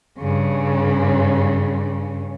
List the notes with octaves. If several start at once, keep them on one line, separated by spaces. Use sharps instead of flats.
G2 C#3